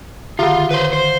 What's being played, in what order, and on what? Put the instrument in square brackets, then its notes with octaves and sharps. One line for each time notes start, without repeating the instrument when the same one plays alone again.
[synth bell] D3 D#3 [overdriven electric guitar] F4
[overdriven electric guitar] B4 C5
C5